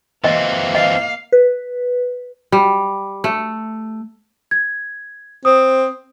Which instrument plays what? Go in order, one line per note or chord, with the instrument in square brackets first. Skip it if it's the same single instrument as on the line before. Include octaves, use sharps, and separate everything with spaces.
[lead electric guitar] E3 C4 [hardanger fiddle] A#3 [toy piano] D#5
[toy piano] D#5 [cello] F5
[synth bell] B4
[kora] G3
A3
[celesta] G#6
[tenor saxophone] C4 [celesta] D#6